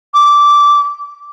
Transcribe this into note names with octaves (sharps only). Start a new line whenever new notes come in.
D6